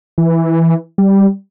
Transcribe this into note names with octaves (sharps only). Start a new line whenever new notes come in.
E3
G3